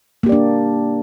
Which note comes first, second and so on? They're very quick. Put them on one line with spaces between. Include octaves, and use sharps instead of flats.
A#3 G4 D5 D4